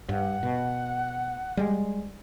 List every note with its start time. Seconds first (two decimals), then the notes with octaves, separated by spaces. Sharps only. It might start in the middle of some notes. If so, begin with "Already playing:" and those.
0.09 G2 F#5
0.43 B2
1.57 G3 G#3